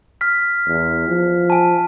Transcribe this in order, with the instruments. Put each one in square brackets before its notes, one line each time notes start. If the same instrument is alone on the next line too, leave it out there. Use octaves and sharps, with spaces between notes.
[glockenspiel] F6 B6
[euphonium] E2
F3
[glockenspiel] G#5 A5